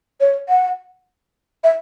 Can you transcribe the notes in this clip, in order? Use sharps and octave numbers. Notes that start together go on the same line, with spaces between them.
C#5
F#5
E5